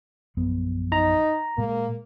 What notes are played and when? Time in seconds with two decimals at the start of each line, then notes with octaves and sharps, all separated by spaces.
0.37 A#1 F#2 B3
0.92 D#4 A#5
1.58 A#2 G#3 A#3